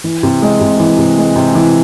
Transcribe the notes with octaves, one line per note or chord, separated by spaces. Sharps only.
E3
C3
G#3
C3
E3
C3
G#3
C3
E3